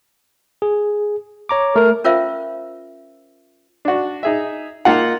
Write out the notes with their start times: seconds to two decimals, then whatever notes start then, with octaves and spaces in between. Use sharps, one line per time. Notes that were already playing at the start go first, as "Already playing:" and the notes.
0.62 G#4
1.49 C#5 A#5 D6
1.76 A3 A#4
2.04 C#4 F4 A#4 C5 E5 F5
3.85 D4 F#4
4.23 D#4 G#4 E5
4.85 A#3 D#4 F4 F#5